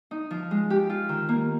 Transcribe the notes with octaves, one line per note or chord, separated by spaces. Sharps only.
D#4
F3
G#3
G4
F4
D#3
A#3